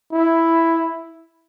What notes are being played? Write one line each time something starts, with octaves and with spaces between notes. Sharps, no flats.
E4